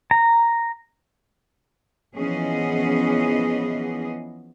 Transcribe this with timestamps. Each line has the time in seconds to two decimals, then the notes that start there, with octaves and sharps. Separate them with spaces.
0.11 A#5
2.16 E3 F3 B3 C#4 G#4 D#5